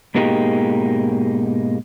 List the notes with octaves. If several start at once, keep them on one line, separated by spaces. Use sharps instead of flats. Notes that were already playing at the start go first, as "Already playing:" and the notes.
G#2 B2 A#3 D#4 G4 G#4